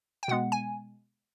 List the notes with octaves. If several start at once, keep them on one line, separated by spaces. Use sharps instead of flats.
G5
B2 G#3 B3 F#5
G#5